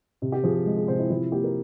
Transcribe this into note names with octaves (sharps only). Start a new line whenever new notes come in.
C3
G4
F3 G#4
G#4
G#3
G#4
C3 C5
E4
F3 E4
A#3 G4
A#4